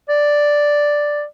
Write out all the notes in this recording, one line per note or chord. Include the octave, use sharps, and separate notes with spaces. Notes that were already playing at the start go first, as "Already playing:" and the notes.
D5